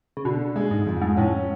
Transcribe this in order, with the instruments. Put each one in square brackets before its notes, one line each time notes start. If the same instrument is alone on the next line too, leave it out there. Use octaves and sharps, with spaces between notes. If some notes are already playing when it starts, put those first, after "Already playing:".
[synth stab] C#3
[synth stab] B2 [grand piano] D3
[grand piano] G#3
[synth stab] G#2
[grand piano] F2
[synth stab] G#2
[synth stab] A2 [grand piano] C#4